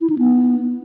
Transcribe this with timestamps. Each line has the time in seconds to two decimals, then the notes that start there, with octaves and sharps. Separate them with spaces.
0.01 E4
0.10 D#4
0.18 B3